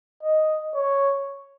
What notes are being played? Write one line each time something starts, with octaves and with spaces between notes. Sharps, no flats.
D#5
C#5